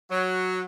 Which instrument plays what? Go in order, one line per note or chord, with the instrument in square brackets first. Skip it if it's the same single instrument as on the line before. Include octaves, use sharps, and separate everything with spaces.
[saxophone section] F#3